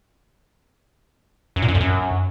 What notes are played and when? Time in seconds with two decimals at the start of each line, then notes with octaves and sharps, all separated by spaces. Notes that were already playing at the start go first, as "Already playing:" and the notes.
1.56 F#2
1.62 A#2
1.68 F#2
1.74 F2
1.81 F#2